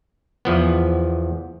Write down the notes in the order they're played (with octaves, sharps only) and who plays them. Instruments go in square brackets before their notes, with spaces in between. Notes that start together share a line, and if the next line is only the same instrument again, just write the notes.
[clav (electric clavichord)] E2 F3 B3